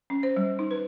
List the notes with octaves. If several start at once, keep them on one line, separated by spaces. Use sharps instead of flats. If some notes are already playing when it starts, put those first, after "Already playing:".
C#4
C5
G3
D#4
B4